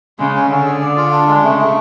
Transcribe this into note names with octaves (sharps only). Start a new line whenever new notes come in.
C#3 G#3
C#4
D3 C#4
G#4
D5
F4
D4
G#3
C#3 A3
A3